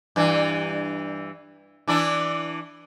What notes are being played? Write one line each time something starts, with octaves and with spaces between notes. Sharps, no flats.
G2 E3
E3 D4 E4